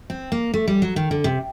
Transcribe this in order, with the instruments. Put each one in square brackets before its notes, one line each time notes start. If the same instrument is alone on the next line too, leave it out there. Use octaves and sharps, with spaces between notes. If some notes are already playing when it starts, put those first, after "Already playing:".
[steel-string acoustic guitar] C4
A#3
A3
G3
F#3
D#3
D3
C3